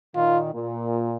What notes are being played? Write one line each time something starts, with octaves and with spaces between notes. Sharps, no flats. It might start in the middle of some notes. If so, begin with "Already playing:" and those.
A#2 D#3 F4
A#2